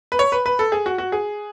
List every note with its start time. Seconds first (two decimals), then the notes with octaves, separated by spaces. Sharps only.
0.12 B4
0.19 C#5
0.32 B4
0.46 B4
0.59 A4
0.72 G#4
0.86 F#4
0.98 F#4
1.12 G#4